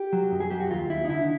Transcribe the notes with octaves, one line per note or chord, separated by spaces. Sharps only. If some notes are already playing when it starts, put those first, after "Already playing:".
Already playing: G4
F#3
F#2
G#4
F#3 G4
F#4
D#2 F4
D#2 E4
D#4
D3 E4